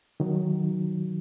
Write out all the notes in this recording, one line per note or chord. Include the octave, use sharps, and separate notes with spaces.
D#3 F#3